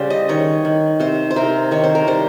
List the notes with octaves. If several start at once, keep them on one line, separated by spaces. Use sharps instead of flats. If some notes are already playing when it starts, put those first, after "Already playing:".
Already playing: C#3 G3 C5
D#5
D#3 C#5
D#3
C3 C5
C5
C3 A#4
D#3 C#5
C5
A#4
G3 C5